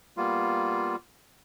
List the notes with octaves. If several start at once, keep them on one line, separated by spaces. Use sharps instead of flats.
G3 A#3 B3 F4